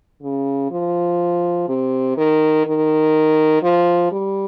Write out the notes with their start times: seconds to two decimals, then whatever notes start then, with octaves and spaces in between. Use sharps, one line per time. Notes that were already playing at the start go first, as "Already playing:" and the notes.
0.23 C#3
0.71 F3
1.68 C3
2.17 D#3
2.66 D#3
3.63 F3
4.12 G3